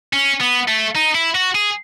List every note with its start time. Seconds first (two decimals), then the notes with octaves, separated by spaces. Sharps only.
0.13 C#4
0.41 B3
0.68 A3
0.95 D#4
1.15 E4
1.35 F#4
1.55 G#4